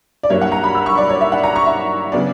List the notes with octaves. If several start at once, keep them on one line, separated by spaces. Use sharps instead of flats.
D5
G2 F#3 A#3 E4 C#5
F#5
A#5
B5
E6
C#6
D5
C#5
E5
F#5
A#5
C#6
E5
C#3 F#3 B3 D4 D5